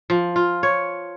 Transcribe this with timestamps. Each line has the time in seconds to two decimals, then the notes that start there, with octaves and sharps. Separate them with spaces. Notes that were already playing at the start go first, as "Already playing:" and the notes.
0.10 F3
0.36 F4
0.63 C#5